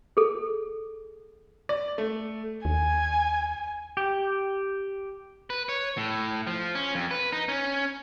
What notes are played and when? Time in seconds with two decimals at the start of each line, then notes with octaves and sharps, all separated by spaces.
0.17 G#4 A4
1.69 D5
1.98 A3
2.65 D#2 G#5
3.97 G4
5.50 B4
5.69 C#5
5.98 A2
6.47 F3
6.75 C#4
6.95 F2
7.11 B4
7.32 D#4
7.49 C#4